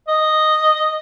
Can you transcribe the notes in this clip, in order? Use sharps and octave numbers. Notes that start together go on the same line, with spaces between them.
D#5